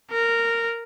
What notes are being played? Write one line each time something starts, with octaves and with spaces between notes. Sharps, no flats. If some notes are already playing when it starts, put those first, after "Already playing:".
A#4